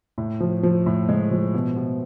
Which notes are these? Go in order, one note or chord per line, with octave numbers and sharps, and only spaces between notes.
A2
F3
F3
A2
G#3
F3
B2
B2